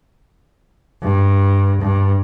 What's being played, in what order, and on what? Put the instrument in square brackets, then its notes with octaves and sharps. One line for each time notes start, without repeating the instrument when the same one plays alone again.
[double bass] G2
G2